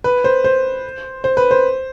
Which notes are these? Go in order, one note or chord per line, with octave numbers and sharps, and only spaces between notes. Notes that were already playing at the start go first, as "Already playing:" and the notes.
B4
C5
C5
C5
B4
C5